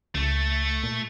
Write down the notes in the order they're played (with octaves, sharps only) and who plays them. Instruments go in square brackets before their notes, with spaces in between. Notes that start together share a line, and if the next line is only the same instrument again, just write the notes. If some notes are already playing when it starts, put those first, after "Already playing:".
[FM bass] C#2 [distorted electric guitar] A3
[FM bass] A#2